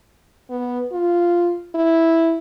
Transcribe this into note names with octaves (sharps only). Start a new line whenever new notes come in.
B3
F4
E4